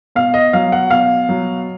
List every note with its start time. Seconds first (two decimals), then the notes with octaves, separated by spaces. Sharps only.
0.15 B2 F5
0.34 D#5
0.53 F#3 F5
0.72 F#5
0.90 B2 F5
1.29 F#3